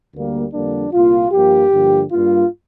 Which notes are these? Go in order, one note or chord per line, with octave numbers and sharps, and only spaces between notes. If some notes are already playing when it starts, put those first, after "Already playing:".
D2 D3 G3 A#3
F2 D3 G3 A#3 D4
C2 A#2 A#3 F4
G2 F3 A#3 G4
G2 D3 F3 A#3
G2 G3 A#3 F4